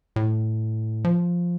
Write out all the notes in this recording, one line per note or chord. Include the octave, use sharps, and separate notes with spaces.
A2
F3